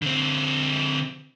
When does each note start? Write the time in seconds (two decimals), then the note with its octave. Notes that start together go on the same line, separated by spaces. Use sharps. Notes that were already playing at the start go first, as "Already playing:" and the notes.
0.02 D3 C4